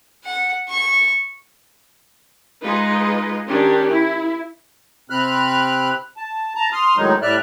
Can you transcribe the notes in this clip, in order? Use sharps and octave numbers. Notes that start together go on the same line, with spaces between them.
F#5
C#6
G#3 D#4 F4 B4 D#5
D#3 C#4 D4 G4
E4
C3 C4 B5 F6 F#6
A5
A5 A#5
C6 D#6 F6
A2 D#3 F#3 G#3 D#4
A2 G3 D5 E5 F6 F#6